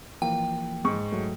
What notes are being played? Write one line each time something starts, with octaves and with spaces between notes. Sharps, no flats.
E3 F3 A#3 G5
G#2 C#6
F#3 A3